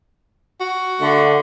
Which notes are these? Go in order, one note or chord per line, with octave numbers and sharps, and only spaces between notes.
F#4
D3 A3